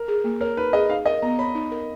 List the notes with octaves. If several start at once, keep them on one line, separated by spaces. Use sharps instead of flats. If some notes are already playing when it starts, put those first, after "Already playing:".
Already playing: A#4
G#4
A#3
A#4 C#5
D#4 B4
G#4 D#5
D#4 F5
A#4 D#5
B3 A#5
C#5 B5
D#4
A#4